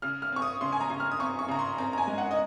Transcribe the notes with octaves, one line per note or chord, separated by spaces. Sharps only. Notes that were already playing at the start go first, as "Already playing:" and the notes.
C#3 F6
F6
C4 C#6
D#6
C#3 C6
G#5
A#5
C#3
F6
D#6
C4 C#6
C#6
C#3 A#5
C6
C4 A#5
A#5
G#5
G#3
F#5
D#5